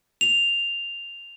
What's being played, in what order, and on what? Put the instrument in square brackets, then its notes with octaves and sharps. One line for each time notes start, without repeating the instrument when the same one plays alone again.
[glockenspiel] F7